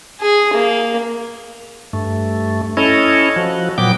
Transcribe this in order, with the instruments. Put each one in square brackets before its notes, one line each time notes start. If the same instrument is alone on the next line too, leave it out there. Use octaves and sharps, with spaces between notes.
[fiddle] G#4
A#3
[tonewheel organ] G2 A3
C#4 E4 A4 C#5 D#5
F3 F#4
A#2 F#3 B3 G5 D6